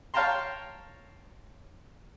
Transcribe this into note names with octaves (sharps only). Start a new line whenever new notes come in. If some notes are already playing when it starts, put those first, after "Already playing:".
C#5 F5 G5 A5 A#5 C6